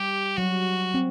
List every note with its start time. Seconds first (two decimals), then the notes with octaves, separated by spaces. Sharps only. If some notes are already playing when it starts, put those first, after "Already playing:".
Already playing: G3 G4
0.37 F#3 F#4
0.94 C4